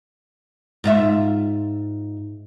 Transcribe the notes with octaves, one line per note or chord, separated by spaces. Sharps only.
G#2 F4 E5